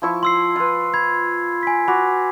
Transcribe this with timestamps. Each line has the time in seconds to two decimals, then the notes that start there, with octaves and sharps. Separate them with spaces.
0.02 F3 E4 C#6
0.23 C6 E6 C7
0.56 F4 B4
0.94 B5 G#6
1.63 G#5 B6
1.88 F#4 B5 D6